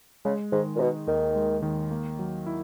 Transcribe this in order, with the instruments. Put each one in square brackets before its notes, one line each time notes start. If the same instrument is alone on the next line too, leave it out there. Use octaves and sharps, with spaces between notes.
[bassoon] C#3 [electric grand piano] G#3
[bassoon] G#2 [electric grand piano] D#3
[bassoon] A#2
[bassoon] B2 [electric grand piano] D#4
[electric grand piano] D#2 [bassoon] D#3
[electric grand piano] G#3
D#3
A#3
F#3
E4